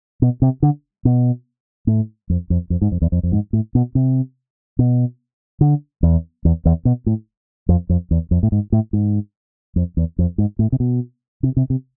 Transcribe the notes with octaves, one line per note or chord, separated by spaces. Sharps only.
B2
C3
D3
B2
A2
F2
F2
F2
G#2
F2
E2
F2
F2
G#2
A2
B2
C3
B2
D3
E2
E2
E2
B2
A2
F2
F2
E2
F2
A2
G#2
A2
G#2
F2
E2
F2
G#2
A2
C3
B2
C3
C3
C3